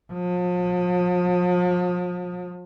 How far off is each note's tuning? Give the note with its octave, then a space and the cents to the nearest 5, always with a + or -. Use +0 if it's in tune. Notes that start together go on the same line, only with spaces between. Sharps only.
F3 +40